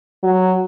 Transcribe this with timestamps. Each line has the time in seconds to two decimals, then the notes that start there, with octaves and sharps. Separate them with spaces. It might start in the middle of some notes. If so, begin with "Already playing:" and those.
0.24 F#3